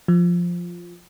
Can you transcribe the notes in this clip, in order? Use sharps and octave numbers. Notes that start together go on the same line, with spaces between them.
F3